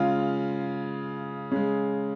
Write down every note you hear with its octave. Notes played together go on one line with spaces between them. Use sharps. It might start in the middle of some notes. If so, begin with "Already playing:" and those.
Already playing: C#3 G#3 F4 F5
C#3 G#3